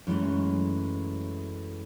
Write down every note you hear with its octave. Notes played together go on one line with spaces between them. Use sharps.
F#2 E3 F3 G#3 A3